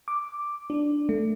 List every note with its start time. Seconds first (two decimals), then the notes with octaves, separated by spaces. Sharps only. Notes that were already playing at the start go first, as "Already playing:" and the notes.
0.08 D6
0.70 D4
1.09 A3